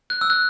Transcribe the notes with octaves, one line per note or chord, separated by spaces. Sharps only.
F#6
E6
F#6